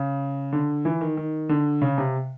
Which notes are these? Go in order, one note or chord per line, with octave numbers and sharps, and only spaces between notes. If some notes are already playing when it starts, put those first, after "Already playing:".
Already playing: C#3
D3
E3
D#3
D#3
D3
C#3
C3